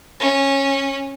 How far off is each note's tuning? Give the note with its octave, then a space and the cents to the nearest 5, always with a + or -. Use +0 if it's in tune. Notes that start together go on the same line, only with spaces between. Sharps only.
C#4 -15